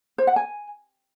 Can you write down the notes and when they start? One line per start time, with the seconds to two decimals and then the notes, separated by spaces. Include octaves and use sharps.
0.18 C5
0.27 F#5
0.36 G#5